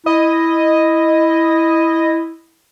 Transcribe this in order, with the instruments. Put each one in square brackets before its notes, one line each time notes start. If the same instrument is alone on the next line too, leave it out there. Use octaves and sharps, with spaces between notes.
[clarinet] E4 [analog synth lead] D#5